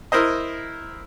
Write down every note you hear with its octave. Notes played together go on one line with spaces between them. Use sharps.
E4 A#4 C5 D#5